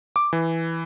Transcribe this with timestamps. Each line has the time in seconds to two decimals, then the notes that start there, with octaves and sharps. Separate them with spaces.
0.16 D6
0.33 E3